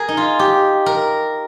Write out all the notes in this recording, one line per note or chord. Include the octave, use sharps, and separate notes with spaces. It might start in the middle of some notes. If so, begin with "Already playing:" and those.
Already playing: G#4 A#4
D#4
F4
G4
A#4